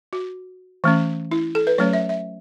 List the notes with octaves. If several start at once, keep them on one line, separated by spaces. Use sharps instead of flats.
F#4
E3 A3 C#4
E4
A4
B4
F#3 A3 C#4 C#5
E5
E5